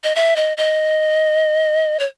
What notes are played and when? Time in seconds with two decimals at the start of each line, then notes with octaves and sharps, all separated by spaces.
0.04 D#5
0.15 E5
0.36 D#5
0.57 D#5
2.00 C#5